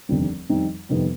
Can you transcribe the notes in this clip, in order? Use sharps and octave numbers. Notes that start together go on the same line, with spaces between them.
F1 D#2 D3 G3 C4
F2 D#3 G3 C4 D#4
F2 C3 D#3 G3 B3